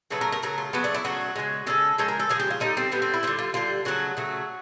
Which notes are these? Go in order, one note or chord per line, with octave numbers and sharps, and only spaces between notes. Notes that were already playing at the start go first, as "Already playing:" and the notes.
C#3 F#3 A3 B4
A#4
A#4
C#3 F#3 A3 A#4
F4
C#3 F#3 A3 B3
D4
E4
C#3 F#3 A3 F#4
C#3 F3 G#3
C#3 F3 G#3 A4
C#3 F3 G#3 A4
A#4
A4
C#3 F3 G#3 G#4
G4
F4
D3 G3 D#4
C4
D3 G3 B3
C4
E4
D3 G3 F4
F4
D3 G3 F4
C#3 F#3 A3 F#4
C#3 F#3 A3